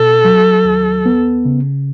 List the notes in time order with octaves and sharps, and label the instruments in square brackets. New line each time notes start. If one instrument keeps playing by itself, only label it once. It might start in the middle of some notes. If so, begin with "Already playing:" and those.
Already playing: [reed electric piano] B2 [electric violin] A4
[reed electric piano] F#3
D#2
B3
C#3